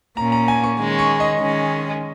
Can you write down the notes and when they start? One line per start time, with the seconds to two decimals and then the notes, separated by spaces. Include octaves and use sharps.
0.17 A#2 A#3 C#4 A#5
0.32 A#5
0.48 G#5
0.64 C#6
0.79 D#3 G#3 C#4
0.99 C#6
1.20 D#5
1.40 D#3 G#3 C#4